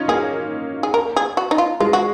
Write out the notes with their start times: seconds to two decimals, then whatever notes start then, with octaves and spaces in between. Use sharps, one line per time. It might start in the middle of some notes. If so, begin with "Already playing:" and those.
Already playing: C#4 D#4 F4
0.08 A#3 G#4
0.83 G#4
0.94 A#4
1.16 G#4
1.37 F#4
1.51 D#4
1.58 F4
1.80 G#3 F4
1.93 F#4